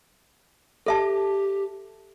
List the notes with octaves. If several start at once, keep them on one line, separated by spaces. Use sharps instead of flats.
G4 A4 E5 A5